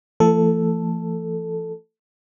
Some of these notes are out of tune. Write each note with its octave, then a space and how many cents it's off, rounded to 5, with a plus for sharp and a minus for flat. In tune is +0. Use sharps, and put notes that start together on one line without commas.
F3 -45 A3 +40 A4 +0